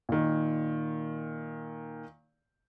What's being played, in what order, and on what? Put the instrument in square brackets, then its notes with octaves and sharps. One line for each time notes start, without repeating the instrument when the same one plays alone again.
[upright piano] A#2 D#3